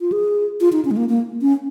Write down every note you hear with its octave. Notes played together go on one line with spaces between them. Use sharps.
F4
G#4
F4
D#4
C#4
G#3
A#3
A#3
C#4